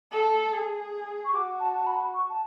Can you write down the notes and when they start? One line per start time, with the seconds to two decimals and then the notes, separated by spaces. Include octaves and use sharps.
0.13 A4
0.53 G#4
1.25 C#6
1.33 F#4 D6
1.60 A5
1.79 A5
1.87 B5
2.14 C#6
2.30 A5